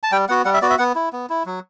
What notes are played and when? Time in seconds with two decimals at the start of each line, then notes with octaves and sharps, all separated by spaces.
0.03 A5
0.12 G3 G5
0.29 B3 F#4 F#5
0.45 G3 F#5
0.54 E5
0.62 B3 F#4 D5
0.70 E5
0.79 B3 F#5
0.95 E4
1.13 B3
1.30 E4
1.46 F#3